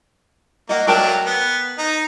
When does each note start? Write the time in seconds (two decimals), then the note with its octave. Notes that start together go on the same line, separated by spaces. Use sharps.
0.69 A#3 D#5 F#5
0.87 F#3 A3 D4 A#4 G5 A5
1.26 B3
1.78 D#4